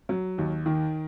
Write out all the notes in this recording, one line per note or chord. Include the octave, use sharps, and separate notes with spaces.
F#3
D#2
D#3